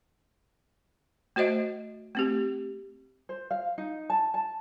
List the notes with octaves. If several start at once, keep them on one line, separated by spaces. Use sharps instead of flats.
A3 F#4 C5 D#5 E5
A3 C4 G4
C5
F5
D#4
A5
A5